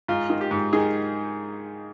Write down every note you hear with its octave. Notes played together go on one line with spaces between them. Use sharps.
G#2 F4
D#3
G4
G#2
D#3 G#4